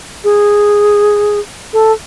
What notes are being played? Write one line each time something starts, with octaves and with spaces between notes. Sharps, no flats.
G#4
A4